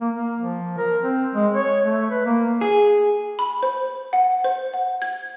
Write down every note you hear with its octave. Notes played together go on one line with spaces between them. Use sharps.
A#3
A#3
F3
A#4
C4
G#3
C#5
A3
B4
A#3
G#4
B5
C5
F#5
C5
F#5
G#6